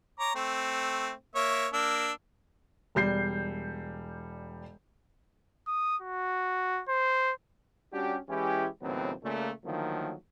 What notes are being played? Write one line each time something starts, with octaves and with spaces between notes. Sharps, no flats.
C#5 A#5 D6
A3 C4
A#3 C#5 E5
A#3 D4 E6
E1 G3 G6 C7
D#6
F#4
C5
G3 C#4 D4 F#4 G4
E3 G#3 C#4 E4 G4
D#2 A2 C#3 F#3 B3 C4
A#2 C#3 A3
D3 D#3 F3 F#3 A3 A#3